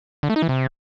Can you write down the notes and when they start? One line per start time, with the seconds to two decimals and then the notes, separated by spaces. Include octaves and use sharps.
0.23 D3
0.30 A3
0.36 D#4
0.42 E3
0.49 C3